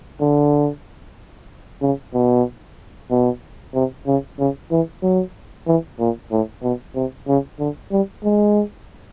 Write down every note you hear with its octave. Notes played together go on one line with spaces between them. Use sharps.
D3
C#3
B2
B2
C3
C#3
C#3
E3
F#3
E3
A#2
A2
B2
C3
C#3
D3
G3
G#3